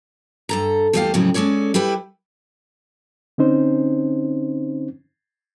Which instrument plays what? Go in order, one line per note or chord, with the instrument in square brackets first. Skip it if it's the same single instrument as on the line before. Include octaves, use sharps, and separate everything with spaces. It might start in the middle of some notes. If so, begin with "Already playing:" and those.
[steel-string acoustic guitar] G2 A4 A#5
E2 G3 A3 B4 F5 G5
F2 A2 C#3 F#3 G#3 C4
G#3 C#4 A4 C#5 D5
G3 E4 G4 B4
[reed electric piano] D3 C4 C#4 D#4 C5